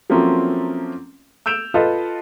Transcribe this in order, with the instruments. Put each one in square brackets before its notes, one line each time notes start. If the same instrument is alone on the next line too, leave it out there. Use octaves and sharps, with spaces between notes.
[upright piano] F3 F#3 A3 A#3 C4 C#4
E6 G6 D7 E7 F7
F4 A4 B4 D#5